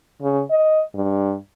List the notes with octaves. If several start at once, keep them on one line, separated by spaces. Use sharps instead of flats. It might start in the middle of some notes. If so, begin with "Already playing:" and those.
C#3
D#5
G2